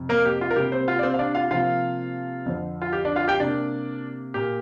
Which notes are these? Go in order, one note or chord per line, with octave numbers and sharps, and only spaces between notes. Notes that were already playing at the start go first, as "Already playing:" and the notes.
Already playing: F2 C3
A#3 A#4
G4
F4
A#4
C3 G3 A#3 G4
C4 C5
F4 F5
D5
C4 C5
F5
D4 D5
F4 F5
C3 F3 A#3 F4 F5
F2 D3 F3
F4
G4
D4 D5
F4 F5
G4 G5
C3 A#3 D4 D5
A#2 A#3 G4